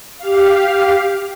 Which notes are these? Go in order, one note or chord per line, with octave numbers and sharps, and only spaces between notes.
G4 F5